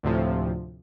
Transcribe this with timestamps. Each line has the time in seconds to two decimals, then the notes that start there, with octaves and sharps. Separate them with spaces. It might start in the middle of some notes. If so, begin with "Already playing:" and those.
0.03 D2 A2 C3 F3